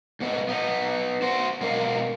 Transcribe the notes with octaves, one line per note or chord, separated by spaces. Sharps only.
G#2 B3 B4 D#5
B3 D#4
F#4 C5
B2 G#3 A#4 F5